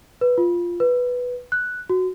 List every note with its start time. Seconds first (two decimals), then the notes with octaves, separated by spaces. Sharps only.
0.21 B4
0.38 F4
0.80 B4
1.52 F#6
1.90 F#4